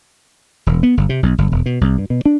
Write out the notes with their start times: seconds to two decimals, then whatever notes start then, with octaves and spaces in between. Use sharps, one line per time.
0.67 E1
0.83 B3
0.97 G1
1.09 C3
1.23 B1
1.38 G1
1.52 E1
1.66 B2
1.81 C2
1.98 G2
2.10 B2
2.26 D4